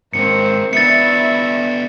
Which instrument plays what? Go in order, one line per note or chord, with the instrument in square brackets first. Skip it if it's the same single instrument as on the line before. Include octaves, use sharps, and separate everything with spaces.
[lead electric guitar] G#2 D#3 [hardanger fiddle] A#3 C4 [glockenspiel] C#7
[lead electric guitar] B3 D4 [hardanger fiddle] E4 E5 [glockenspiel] A6 C#7